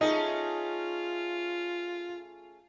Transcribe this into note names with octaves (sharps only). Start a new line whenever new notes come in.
A3 C#4 D#4 F4 G#4